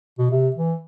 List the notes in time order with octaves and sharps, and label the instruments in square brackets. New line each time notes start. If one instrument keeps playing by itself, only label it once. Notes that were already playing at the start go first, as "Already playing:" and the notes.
[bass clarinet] B2
C3
E3